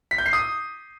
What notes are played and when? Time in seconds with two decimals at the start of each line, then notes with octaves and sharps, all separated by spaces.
0.11 B6
0.18 G6
0.26 C7
0.33 D#6